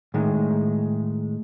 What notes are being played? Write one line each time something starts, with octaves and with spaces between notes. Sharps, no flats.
A2 D#3 G#3